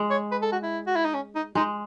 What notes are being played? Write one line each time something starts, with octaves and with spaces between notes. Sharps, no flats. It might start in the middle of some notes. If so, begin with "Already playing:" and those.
Already playing: G#3
C#5
B4
A4
F#4
E4
F#4
E4
D#4
C#4
D#4
G#3 D#4